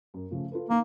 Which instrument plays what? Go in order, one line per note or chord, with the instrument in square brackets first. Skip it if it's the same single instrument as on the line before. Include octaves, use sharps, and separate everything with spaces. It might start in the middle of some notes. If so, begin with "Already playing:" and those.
[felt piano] F#2
C#3 F3 A3
F4 A4 B4
[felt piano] D#3 [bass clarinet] A#3